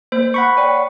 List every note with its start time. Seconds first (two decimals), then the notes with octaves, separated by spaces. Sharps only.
0.12 A#3 C5 G6
0.34 F#5 B5 C#6
0.57 C#5 D5 G5